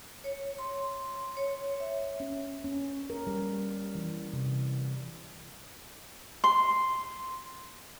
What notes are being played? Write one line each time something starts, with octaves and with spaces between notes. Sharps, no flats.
C#5
C6
C#5
E5
C#4
C#4
A#4
G3
E3
C3
C6